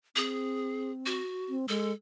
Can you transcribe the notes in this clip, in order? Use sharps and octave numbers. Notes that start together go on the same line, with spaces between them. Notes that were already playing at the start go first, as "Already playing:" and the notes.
C4 G#4
F#4
C4
G#3 A4